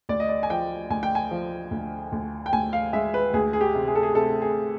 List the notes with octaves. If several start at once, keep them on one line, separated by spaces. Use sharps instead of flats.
D2 D5
D#5
D5
G#5
F3 G5
D2 G#5
G5
G#5
F3
D2
D2
G5
D2 G#5
F5
G#3 E5
B4
D2 G#4
G#4
G4
C3
G#4
A4
G#4
C3 A4
G#4